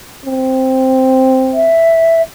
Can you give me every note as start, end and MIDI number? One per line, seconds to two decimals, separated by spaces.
0.25 1.73 60
1.53 2.22 76